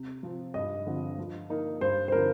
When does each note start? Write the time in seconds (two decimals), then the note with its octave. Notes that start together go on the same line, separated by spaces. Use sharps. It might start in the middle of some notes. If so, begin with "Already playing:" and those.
Already playing: C3
0.23 F3 C4
0.54 G2 D#5
0.87 D3 F3 C4
1.18 F3
1.50 A#3 D#4 A#4
1.81 G2 C5
2.08 C5
2.12 D3 F3 C4 D#4 A#4